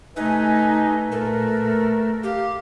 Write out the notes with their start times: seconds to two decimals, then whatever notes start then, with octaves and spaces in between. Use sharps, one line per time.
0.16 C3 A3 D#4 B4 E5 G#5
1.12 A#2 A3 A#4
2.23 G4 F5